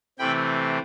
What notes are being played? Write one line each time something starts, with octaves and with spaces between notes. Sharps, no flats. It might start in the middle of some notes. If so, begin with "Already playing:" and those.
C3 E3 A3 C4 G5 B5